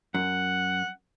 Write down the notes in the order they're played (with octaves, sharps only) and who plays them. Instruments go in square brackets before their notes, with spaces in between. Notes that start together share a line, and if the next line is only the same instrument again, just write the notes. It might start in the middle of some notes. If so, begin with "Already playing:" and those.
[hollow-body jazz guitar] F#2 [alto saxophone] F#5